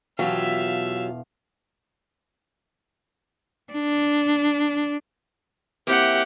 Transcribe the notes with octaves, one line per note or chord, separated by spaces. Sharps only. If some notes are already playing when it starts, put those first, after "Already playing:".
E1 B2 F#3 F4 G4 E5 F5
D4
A#3 C4 E4 G4 F#5